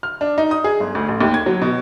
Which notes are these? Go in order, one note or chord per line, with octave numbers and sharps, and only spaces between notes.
F6
D4
D#4
D#6
G#4
G1
D2
A1
D#2
G#6
F#3
B2